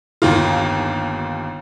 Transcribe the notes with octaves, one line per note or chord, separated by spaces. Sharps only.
G1 D#2 F4